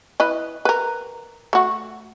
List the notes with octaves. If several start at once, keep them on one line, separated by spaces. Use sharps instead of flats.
E4 B4 D#5
A#4 B4
A3 F#4